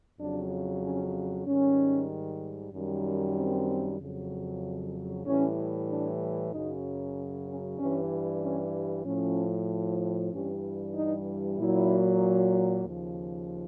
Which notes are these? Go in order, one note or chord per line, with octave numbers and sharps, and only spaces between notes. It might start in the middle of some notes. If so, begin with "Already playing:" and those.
F2 C#3 F#3 D4
C#4
G#2 D#3 G3 C#4
F#2 D#3 G3
C4
F2 C#3 F#3
A2 E3 G3 C#4
D4
F#2 C#3 F#3 D#4
C#4
G2 E3 G3 C#4
C#4
A2 F3 C#4
G2 E3 G3 C#4
D#4
A#2 F#3 E4
D#2 C#3 F3